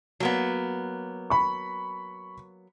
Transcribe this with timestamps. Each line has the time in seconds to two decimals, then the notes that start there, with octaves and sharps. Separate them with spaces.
0.20 F#3 A#3 B3
1.30 B5 C#6